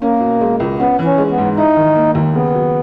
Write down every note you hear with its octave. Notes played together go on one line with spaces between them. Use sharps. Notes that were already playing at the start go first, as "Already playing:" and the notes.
A#3 C#4
B2
G#3
C#2
B3 C#4
E3
C#4
G#3
B3
G#2
D#4 E4
D#3
A#3
D#2
C#3 B3
F#3